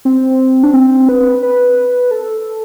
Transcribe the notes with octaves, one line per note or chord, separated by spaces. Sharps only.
C4
D4
C4
B4
B4
A4